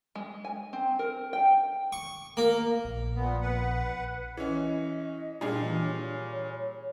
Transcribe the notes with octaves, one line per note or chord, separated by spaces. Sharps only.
G#3
G#5
C4
A#4
G5
C#6
A#3
A#1
A#2 B3
B4 F#5
E3 C#4 D#5
A#2 G3 D4 G#4
E3
C#5